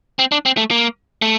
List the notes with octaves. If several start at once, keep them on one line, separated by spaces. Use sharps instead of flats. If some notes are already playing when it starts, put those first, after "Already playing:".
C4
D4
C4
A3
A#3
A3